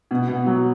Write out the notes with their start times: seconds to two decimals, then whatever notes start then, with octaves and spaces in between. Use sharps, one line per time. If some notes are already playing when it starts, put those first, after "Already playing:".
0.11 B2
0.28 B2
0.46 F#3